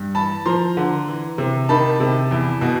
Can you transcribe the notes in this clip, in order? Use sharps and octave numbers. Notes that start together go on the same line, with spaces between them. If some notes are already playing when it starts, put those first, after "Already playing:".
Already playing: G2
E3 A5 B5
F3 A#5 C6
D3
E3
C3
D#3 A5 B5
C3
E2
B2